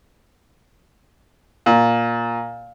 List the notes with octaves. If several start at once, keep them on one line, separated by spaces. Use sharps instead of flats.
A#2